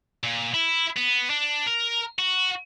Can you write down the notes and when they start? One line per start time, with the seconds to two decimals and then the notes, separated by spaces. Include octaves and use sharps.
0.23 A#2
0.54 E4
0.97 B3
1.30 D4
1.67 A#4
2.19 F#4